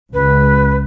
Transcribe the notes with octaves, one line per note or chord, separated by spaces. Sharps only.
C#2 B4